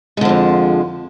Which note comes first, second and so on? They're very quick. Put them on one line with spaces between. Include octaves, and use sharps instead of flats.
G#3 D3 F3 F2